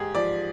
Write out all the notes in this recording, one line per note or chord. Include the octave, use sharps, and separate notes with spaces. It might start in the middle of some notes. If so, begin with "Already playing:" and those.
Already playing: G#2 G4 G#4
F3 D5